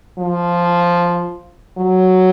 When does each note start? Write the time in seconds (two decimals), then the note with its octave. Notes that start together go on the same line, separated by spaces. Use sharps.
0.18 F3
1.78 F#3